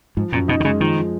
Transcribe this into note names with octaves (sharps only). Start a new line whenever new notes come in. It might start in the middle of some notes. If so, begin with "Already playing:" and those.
G#2 F3
F#2 A#2
B2 D#4
D#3
C#3 G#3
D#3 F3
F3